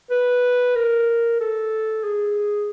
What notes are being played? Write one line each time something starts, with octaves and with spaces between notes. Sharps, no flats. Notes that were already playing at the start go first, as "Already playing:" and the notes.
B4
A#4
A4
G#4